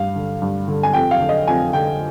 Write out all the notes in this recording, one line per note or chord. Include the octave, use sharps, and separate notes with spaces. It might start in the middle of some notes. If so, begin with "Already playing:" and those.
Already playing: G2 F5
D3
G2
D3
G#5
F2 G5
F5
D3
D#5
F2 G#5
D3 G5